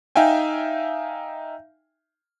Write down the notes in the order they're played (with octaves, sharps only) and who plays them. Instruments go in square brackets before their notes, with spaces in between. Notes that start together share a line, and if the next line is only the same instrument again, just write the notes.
[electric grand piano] D#4 E5 F5 G5 G#5